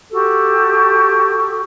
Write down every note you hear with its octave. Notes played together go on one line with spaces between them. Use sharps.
F#4 G4 A4